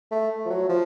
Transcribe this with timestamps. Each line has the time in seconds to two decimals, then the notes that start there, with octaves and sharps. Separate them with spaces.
0.11 A3
0.45 F3
0.50 F#3
0.69 F3